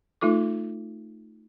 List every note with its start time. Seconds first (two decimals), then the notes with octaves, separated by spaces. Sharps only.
0.21 A3 D#4 F4 A4 D6